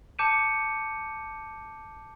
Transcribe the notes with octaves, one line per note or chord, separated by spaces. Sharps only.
A5 D6 G6 C#7 D#7 E7